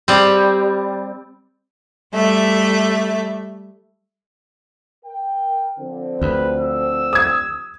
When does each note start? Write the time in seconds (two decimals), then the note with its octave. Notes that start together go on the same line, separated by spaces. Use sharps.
0.08 G3 C4
2.12 G3 A3 E5
5.05 A#4 G5
5.79 D3 F3 C4
6.22 D2 B4
6.60 E6
7.13 D#6 G#6